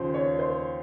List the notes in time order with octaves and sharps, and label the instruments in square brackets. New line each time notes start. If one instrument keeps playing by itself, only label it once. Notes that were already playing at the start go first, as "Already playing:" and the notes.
Already playing: [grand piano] D#2 C#3 F3 C5
C#5
C5